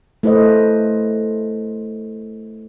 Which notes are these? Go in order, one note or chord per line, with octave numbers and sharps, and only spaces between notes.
A3 E4 B4 C5 D#5